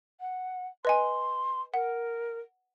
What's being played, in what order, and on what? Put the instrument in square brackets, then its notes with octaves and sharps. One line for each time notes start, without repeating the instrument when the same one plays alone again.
[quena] F#5
[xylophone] B4 D#5 G#5 [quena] C6
[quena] A#4 [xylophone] F#5